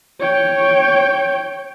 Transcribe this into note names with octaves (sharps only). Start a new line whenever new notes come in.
C#5 G5